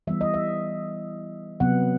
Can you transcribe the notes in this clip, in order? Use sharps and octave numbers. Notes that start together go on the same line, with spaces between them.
E3 G3 B3 E5
D#5
E5
C3 F#3 B3 F#5